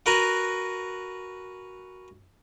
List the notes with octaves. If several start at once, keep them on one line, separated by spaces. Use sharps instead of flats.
F#4 A#4 B4 F#5 G#5 A#5